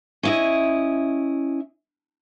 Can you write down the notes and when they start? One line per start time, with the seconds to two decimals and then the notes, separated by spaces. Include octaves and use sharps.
0.23 C#4 E4 D#5